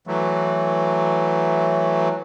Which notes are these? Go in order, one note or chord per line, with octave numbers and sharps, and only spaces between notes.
E3 F#3 A3